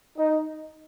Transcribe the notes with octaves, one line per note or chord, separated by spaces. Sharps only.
D#4 D#5